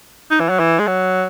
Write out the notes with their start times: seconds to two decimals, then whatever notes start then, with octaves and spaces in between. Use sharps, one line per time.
0.31 D#4
0.40 E3
0.49 F#3
0.59 E3
0.79 G#3
0.87 F#3